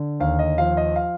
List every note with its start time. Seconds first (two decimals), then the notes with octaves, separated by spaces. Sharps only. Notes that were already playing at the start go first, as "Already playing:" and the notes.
Already playing: D3
0.20 D#2 F5
0.39 D#5
0.58 F3 F5
0.77 D#5
0.96 F5